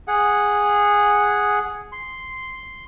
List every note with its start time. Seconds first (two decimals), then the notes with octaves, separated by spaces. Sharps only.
0.08 G#4 F#5
1.92 C6